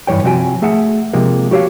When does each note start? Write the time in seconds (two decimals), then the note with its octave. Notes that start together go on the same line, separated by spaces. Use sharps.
0.07 G2 E3 F3 C#5 G5
0.24 C3 F3 F#4 D5 G5 G#5
0.62 A3 G#4 E5 F#5
1.13 C3 F3 G#3 A#3
1.51 F#4 G4 C#5 D#5 F5